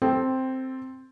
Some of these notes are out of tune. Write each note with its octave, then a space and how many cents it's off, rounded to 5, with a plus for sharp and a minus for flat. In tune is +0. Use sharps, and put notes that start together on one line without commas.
C4 +0 A4 +5 G5 +0